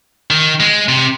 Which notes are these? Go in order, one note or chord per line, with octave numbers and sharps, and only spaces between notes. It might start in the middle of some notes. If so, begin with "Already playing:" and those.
D#3
G#3
C3